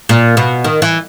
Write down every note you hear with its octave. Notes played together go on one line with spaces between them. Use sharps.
A#2
B2
D#3
E3